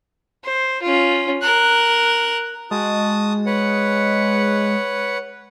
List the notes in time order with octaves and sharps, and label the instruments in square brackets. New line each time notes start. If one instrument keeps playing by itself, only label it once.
[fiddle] C5
C#4 F4
A#4 F#6
[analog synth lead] G#3 [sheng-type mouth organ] F#4 A5 D#6
[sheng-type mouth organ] B4 C#5 F#5